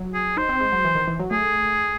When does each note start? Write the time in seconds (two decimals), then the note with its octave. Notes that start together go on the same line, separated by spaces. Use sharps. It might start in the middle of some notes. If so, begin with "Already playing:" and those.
Already playing: F#3
0.14 G#4
0.37 D#4 C5
0.49 C4
0.61 G#3
0.72 F#3
0.85 E3
0.95 D#3
1.08 E3
1.20 F#3
1.31 A3 G#4